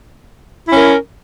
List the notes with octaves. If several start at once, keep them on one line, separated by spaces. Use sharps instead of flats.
C#4 E4 A#4